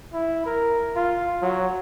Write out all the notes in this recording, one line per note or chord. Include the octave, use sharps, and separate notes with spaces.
E4
A#4
F4
F#3